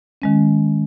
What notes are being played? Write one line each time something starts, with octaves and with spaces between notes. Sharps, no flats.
D#3 G#3 C#4